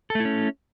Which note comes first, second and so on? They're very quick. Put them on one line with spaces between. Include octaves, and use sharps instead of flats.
A4 A3 E4 C#4